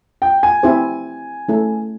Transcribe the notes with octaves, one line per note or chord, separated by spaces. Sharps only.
G5
G#5
C4 E4 G4 C5
A3 C#4 E4 A4